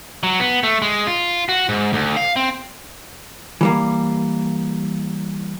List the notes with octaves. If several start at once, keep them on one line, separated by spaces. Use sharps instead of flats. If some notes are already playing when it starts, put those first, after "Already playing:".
F#3
B3
A3
G#3
F4
F#4
G#2
D2
F5
C4
E3 G3 A#3